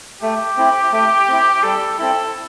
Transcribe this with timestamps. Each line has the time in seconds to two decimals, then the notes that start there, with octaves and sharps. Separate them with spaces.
0.22 A3 G4
0.57 C4 E4
0.92 A3
1.28 C4 E4
1.63 G3 A4
1.99 C4 E4 A4